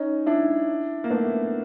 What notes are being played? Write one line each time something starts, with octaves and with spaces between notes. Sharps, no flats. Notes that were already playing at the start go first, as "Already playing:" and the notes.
Already playing: C#4 D#4
D4 E4
A#3
A3 B3